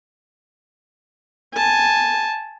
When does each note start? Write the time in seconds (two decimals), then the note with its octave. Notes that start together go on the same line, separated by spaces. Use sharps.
1.55 G#5 A5